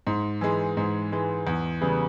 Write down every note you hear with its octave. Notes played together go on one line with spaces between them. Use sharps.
G#2
E3 G#3
G#2
E3 G#3
E2
C#3 E3 G3 B3